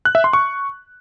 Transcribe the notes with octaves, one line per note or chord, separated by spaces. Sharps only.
F#6
E5
C6
C#6